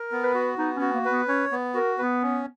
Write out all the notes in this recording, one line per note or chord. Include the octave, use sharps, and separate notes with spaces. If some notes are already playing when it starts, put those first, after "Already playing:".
Already playing: A#4
B3
B4
F#4
B3 D#4
C#4
F#4
A#3
B4
B3
C#4 C#5
B3
F#4 A#4
B3 B4
C#4